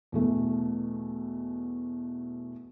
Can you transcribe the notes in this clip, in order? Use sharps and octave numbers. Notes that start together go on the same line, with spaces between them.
E2 B2 A3